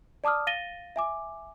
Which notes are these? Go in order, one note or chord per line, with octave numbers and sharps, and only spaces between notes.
D5 A5 D6 D#6 F6
F5 A6 A#6 D#7 G7
E5 G#5 D6